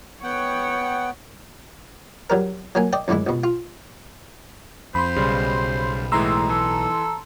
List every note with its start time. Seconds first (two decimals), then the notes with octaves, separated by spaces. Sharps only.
0.23 B3 C#5 F#5 G5
2.30 F#3 G3 A#4
2.75 F#3 A#3 G#5
2.93 D5 D#5 G5
3.08 F#2 A2 D3 G#3 E4
3.27 C#2 B2
3.44 F4
4.95 F2 C5 B5 C6
5.16 B1 C#3 G3
6.12 A2 E3 G#3 A#5 C6 E6
6.49 E3 A4